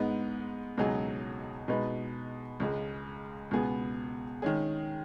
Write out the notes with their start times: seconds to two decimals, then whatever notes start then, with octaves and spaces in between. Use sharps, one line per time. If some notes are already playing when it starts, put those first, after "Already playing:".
Already playing: G#2 G#3 B3 D#4
0.77 C#2 B2 F#3 D#4 G#4
1.68 B2 G#3 D#4 B4
2.60 C#2 C#3 G#3
3.51 C#2 B2 B3 G#4
4.42 D#3 G#3 C#4 G#4